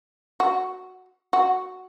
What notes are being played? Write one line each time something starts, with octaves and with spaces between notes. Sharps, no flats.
F#4
F#4